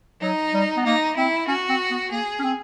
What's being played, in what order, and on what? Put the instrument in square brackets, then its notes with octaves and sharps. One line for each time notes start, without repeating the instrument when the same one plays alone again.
[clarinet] F#3 [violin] D#4
[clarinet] G3
B3
[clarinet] A#3 [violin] D#4
[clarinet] C4 [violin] E4
[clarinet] C#4 [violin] F#4
[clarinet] C4
B3
[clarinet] A#3 [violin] G#4
[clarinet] C#4
C4